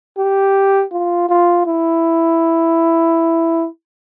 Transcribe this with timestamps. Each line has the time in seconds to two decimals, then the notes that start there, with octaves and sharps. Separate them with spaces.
0.17 G4
0.92 F4
1.29 F4
1.66 E4